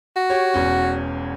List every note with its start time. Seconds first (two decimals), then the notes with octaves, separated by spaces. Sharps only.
0.16 F#4
0.30 G4 C#5
0.54 E1 E2 C#4